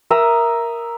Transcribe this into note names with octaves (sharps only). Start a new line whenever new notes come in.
A#4 E5 A#5 D#6